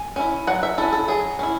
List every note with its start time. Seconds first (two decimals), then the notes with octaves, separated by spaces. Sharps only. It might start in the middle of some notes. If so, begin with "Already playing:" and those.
Already playing: G#5
0.16 C#4 E4
0.47 F#3 F#5
0.63 E5
0.78 C#4 E4 A4
0.93 A4
1.08 F#3 G#4
1.39 C#4 E4